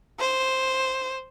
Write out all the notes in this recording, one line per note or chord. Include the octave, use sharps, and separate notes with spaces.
C5